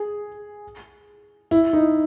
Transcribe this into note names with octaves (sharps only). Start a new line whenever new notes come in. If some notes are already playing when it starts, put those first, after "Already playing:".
Already playing: G#4
E4
D#4